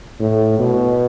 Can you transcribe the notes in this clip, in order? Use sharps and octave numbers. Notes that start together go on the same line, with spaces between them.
A2
B2